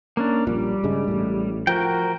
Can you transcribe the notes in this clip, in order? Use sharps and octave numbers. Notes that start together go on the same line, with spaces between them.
A#3 C#4 D4
A#1 A#2 G3
G2 C#3 G#3
A1 A2
F3 F#4 A#4 G5